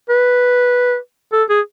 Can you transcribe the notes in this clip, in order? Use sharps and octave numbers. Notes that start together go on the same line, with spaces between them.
B4
A4
G#4